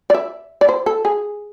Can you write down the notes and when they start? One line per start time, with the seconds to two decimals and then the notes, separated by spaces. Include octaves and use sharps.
0.10 D5
0.14 E5
0.61 D5
0.69 C5
0.86 A4
1.05 G#4